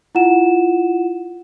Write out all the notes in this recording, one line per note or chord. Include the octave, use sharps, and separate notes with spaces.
E4 F4 F#5 E7